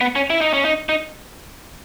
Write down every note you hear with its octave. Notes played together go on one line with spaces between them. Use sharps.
B3
C#4
E4
D#4
C#4
D#4
D#4